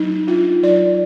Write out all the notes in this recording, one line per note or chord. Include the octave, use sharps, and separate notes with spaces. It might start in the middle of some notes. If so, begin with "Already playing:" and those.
Already playing: F#3 D#4
D4 F4
F#3 D5